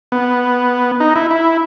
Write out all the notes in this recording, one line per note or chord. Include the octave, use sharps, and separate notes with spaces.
B3
D#4
E4
E4